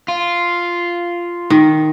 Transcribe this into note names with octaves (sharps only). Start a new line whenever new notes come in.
F4
D#3